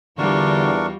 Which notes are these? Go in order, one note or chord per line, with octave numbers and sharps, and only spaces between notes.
E2 D3 G3 D4 F4 F#4 A#4 C#6